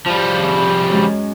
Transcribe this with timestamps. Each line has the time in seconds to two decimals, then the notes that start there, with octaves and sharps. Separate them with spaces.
0.06 F3 G3
0.42 G#5 C#6
0.89 F#2 G#3 C#4